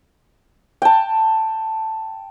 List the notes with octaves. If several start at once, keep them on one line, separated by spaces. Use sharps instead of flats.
G5 A5